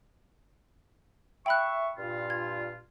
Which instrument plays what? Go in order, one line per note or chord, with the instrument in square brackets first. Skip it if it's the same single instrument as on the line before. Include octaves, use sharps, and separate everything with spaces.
[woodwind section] E5 C#6 [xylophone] G5 B5 F#6
[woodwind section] G2 A#2 F4
[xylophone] G#6